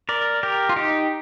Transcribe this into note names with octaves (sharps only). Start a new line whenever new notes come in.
A#4 D5
G4 A#4
F4
D#4 G4